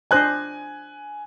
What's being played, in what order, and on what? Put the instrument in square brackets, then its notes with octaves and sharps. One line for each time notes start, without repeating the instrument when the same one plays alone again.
[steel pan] D4 C5 D#5 [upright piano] G#5 F#6